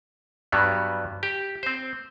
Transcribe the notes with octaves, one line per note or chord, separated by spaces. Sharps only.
G2 F#3 G3 B3
G4
C4 C5